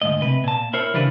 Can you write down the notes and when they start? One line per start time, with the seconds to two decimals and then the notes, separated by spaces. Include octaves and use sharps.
0.02 D2 G#2 D#5
0.22 C3 B4
0.44 A#2 A5
0.73 E4 A#4 C5 C#5
0.94 C#3 E3 G3 D4 B4